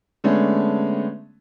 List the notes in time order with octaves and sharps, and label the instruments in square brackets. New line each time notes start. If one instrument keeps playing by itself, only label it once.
[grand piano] D3 G#3 A3 B3 C#4 D4